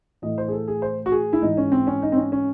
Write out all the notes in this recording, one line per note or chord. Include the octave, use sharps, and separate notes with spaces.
A2 E3 D#5
C5
G#4
A4
G#4
C5
F#4
G#4
E4
G#2 E3 D#4
C#4
C4
C#4
D#4
C4
C#4
C#4